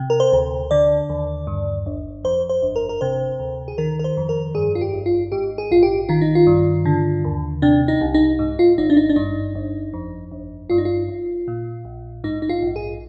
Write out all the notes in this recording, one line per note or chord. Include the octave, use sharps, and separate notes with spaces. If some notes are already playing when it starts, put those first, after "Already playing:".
Already playing: C3
A#4
C5
D2
D3 D5
D#2
G2
G1
F2 C5
C5
G1
A#4
A#4
C3 C5
D2
G#4
D#3 A#4
A#4
C5
F2
A#4
G2 G#4
F4
G4
G#1
F4
G#2 G4
G#4
A#1 F4
G4
D#3 F4
D#4
F4
G2
D3
D#2
C3 D4
D#4
C2
D#4
G#2
F4
G#1 D#4
D4
D#4
D4
G2 D#4
G1
F2
G1
G2 F4
D#4
F4
G#1
A#2
A#1
G#2 D#4
D#4
F4
A#1
G#4